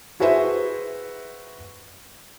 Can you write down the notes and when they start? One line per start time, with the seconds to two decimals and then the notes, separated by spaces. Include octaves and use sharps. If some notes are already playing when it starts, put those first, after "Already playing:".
0.20 E4 F#4 G#4 B4 C5 E5